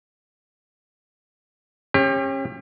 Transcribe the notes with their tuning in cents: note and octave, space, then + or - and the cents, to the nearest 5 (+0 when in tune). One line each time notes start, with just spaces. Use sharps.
C#4 -30 G4 +30